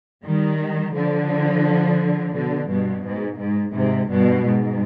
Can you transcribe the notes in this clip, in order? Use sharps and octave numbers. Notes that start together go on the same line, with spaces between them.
D#3 G3
D3 F3
B2 D3
G2 B2
G#2
G#2
G#2 C3
G2 B2
G#2